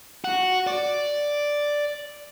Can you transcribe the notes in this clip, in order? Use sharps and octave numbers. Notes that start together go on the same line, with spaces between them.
F#4
D5